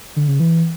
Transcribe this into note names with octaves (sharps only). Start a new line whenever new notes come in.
D3
C#3
E3